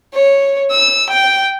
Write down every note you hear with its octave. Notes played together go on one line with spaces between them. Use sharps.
C#5
E6
G5